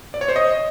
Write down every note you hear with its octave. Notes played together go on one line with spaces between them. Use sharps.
D5
C#5
C5
D#5